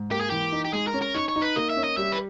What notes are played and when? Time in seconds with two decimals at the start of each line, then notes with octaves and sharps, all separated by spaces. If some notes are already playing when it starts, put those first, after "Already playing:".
Already playing: G#2
0.11 A#3 G4
0.21 G#4
0.30 E3 G4
0.52 D#4
0.64 G4
0.73 G#3 G#4
0.87 A#4
0.94 C#4
1.02 A#4
1.14 D#4 C#5
1.28 C#5
1.36 D#4
1.42 B4
1.56 A#3 D#5
1.69 E5
1.77 C#4
1.84 D#5
1.97 G3 E5
2.12 B4